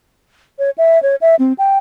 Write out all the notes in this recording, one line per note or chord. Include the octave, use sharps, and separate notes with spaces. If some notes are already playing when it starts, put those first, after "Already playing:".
C#5
E5
C#5
E5
C4
G5